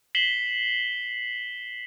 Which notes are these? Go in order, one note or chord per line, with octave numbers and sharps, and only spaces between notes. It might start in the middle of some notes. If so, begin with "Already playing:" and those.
B6 C7 E7 F#7 G7